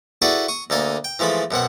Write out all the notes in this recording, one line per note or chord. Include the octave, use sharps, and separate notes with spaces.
E4 F#4 G#4 A4 B4 D5
C#6 D#6
D2 A#3 A4 D#5 G#5
G5
E3 F3 G#3 A3 B5
F#2 B2 C4 F#5